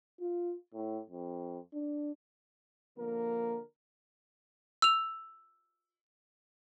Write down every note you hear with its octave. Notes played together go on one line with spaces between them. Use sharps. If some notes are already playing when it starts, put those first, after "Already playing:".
F4
A2
F2
D4
D3 F3 A#3 A#4
E6 F7